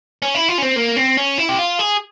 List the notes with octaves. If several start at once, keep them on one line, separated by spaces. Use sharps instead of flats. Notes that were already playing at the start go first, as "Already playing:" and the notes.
C#4
E4
F4
C#4
C4
A#3
C4
C#4
E4
G4
F4
G#4